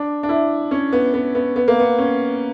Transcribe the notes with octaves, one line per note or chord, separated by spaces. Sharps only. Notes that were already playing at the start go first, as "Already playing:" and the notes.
Already playing: D4
D4
E4
C#4
B3
B3
B3
B3
A#3
B3
C#4